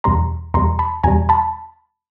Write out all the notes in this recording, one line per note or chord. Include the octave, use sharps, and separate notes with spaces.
E2 B2 G3 A#5 C6
E2 B2 G3 A#5 C6
A5 B5
E2 B2 G3 G#5 A#5
A5 B5